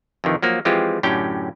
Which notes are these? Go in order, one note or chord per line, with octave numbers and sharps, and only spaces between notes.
F2 C3 D#3 E3
F3 F#3 A#3
E3 F3 G#3 C4 F4 G4
F#2 A2 D3 C#4 G4 G5